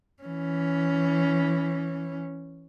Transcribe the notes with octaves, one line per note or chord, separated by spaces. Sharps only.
E3 C#4